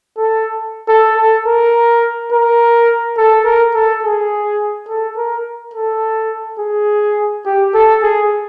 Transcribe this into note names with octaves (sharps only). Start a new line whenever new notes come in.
A4
A4
A4
A#4
A#4
A4
A#4
A4
G#4
A4
A#4
A4
G#4
G4
A4
G#4